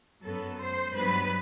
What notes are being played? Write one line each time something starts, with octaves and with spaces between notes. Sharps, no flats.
F#2 F#3 B3 A4
C5
G2 F#3 B3 B4